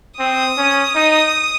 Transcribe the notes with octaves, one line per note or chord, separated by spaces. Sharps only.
C4 D#6
C#4
D#4